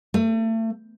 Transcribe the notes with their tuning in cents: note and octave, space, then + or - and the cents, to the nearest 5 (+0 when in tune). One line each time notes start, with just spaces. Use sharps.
A3 +35